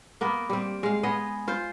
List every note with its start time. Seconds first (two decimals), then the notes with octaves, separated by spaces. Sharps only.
0.21 A#3 B3 A#4
0.50 G3 C4
0.83 G#3 F5
1.03 B3 G#4 D#5
1.48 F4 C5